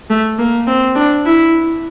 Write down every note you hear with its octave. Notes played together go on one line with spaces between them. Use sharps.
A3
A#3
C4
D4
E4